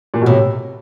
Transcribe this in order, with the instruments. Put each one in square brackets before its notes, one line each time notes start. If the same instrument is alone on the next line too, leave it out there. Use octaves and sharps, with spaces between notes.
[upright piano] A#2
B2
[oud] A2 [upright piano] C3